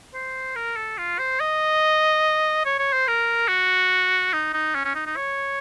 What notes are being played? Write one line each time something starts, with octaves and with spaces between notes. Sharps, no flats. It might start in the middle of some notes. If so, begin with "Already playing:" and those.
C5
A#4
A4
F4
C5
D#5
C#5
C#5
C5
A#4
F#4
D#4
D#4
C#4
C#4
D#4
D#4
C#5